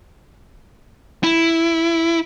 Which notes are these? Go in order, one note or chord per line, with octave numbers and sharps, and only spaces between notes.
E4